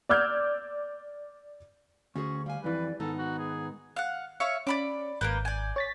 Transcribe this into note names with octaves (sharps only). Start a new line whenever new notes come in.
D5 D6 E6 F6 G6 G#6
D2 C#4 F#4 G#4 C#6
G3 F5 G#5
F2 E3 B4 D5
G#2 D#3 B3 D#4 A4
F#4
G#4
F5 F#5
C#5 E5 F5 C#7
C#4 D5 B5 D6
G#1 A#3 A#4 B4 G6
D5 G#5
C#5 A6 B6